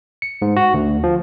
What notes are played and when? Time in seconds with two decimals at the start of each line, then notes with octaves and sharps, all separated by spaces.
0.22 C#7
0.42 G#2
0.56 F#4
0.74 D2
1.04 F3